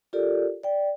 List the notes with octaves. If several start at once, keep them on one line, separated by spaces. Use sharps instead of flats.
F4 G4 A4 A#4 D5
D5 G5